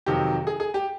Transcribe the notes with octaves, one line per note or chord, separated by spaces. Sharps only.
F2 C3 D#3 F#3 G4
G#4
G#4
G4